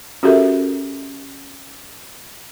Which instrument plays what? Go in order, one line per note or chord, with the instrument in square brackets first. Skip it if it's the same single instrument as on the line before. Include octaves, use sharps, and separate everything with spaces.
[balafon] C#4 F#4 G4 A4 A#4 E5